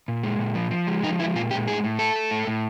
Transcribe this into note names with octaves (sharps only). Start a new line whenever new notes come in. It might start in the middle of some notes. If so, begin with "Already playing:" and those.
A#2
G#3
A#2
F3
F3
G#3
F3 D#4
G#3 E4
A#2 F4
G#3 G4
A2 G#4
A2
A3 A4
A3
A2
A2